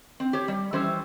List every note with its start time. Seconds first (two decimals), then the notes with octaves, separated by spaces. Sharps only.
0.20 C4
0.33 G4 C5 C#5
0.48 G3
0.73 E3 G3 C#4 C5 E5